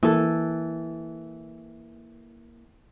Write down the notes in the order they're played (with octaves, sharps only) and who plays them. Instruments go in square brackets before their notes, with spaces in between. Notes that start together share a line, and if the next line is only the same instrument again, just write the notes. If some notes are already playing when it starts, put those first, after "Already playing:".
[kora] E3 A4 [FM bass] A#3